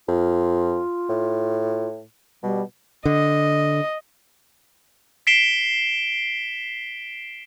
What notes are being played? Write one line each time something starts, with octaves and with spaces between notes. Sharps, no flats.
F2 F4
A2
B2 G3
D3 D#5
B6 C7 D7 E7 G7